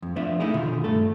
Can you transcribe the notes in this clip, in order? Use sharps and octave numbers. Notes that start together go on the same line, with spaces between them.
F2
F3 B3 D4 E5
A3 D#4 E4 G#4
B2 D3 D#3 F4
G2 A3 A4